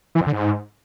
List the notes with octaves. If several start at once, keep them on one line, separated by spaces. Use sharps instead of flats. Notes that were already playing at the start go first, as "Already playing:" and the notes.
E3
F2
D3
G#2